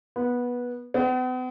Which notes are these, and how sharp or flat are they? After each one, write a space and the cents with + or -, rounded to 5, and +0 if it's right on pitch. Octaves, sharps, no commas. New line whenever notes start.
B3 -15
B3 +45